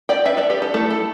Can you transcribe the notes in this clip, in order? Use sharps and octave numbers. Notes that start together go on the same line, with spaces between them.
D5 G5
B4 E5
A4 D5
G4 B4
A4
A3 E4 A4
A4